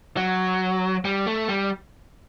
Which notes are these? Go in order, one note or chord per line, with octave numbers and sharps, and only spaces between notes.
F#3
G3
A3
G3